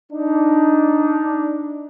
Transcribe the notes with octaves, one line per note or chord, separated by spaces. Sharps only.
D4 D#4